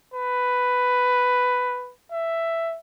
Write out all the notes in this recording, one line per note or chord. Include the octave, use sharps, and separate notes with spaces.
B4
E5